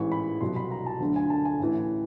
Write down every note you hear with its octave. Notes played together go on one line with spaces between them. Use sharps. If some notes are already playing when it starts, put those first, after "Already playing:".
Already playing: A1 G#2 E3 C#6
B5
C2 B2 F#3 C6
B5
A#5
A5
D2 D3 F#3
G#5
A5
G#5
A1 A2 E3